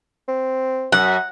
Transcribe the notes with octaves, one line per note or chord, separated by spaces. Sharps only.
C4
F#2 F#5